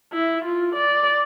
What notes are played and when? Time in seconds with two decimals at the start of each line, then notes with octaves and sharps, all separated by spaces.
0.13 E4
0.45 F4
0.76 D5